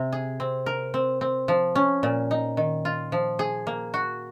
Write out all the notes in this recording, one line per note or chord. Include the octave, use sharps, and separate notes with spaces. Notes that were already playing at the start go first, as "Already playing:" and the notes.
Already playing: C3 C4
G#4
C4
A#4
C4
C4
F3
C#4
A#2
D#4
D#3
F4
F3
G#4
A#3
F#4